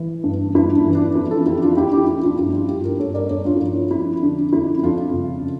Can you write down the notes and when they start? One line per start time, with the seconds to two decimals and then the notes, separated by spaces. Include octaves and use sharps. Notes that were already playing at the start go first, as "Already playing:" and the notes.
Already playing: E3
0.24 G2
0.55 G2 E4
0.75 D4
0.85 E3
0.95 D4
1.15 F2 E4
1.31 F4 A4
1.46 F2 E4 G4
1.62 D4 F4
1.77 F2 E4 G4
1.93 E4 G4
2.07 F3 E4 G4
2.23 D4 F4
2.39 G2 E4
2.53 D4 F4
2.69 G2 E4 G4
2.84 G4 A#4
2.99 G2 A4 C#5
3.14 A#4 D5
3.30 G2 A4 C#5
3.45 D4 F4
3.56 E4
3.61 F3 D4
3.91 F2 E4
4.21 D3 D4
4.52 F2 E4
4.83 F2 D4 F4
5.13 C#3